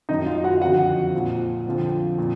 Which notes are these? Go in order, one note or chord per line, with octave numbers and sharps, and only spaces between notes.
F#2 D#3 F#3 D#4 D#5
F4 F5
F#4 F#5
F2 D3 F3 F#4 F#5
A#2 F3
F2 D3 F3
A#2